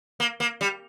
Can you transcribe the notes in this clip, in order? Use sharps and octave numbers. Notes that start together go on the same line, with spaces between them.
A#3
A#3
G3